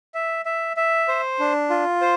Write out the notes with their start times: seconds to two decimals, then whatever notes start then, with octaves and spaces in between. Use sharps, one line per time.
0.14 E5
0.45 E5
0.77 E5
1.08 C5
1.39 D4
1.70 F4
2.01 C5